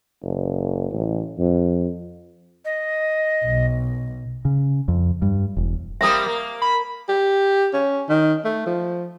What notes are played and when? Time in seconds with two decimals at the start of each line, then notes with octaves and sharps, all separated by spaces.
0.22 F#1
0.92 A1
1.39 F2
2.65 D#5
3.45 B1
4.45 C#3
4.88 F2
5.22 G2
5.57 E1
6.01 G3 A#3 C4 E5 D#6
6.26 A#3
6.62 B5
7.09 G4
7.74 C#4
8.09 D#3
8.44 A3
8.66 F3